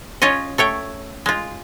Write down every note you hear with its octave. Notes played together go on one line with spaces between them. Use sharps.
C#4 F4 C#5 D#5
A3 C#5 G5
G#3 F4